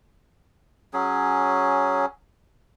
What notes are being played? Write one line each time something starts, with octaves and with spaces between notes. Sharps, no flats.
F#3 C#4 G#4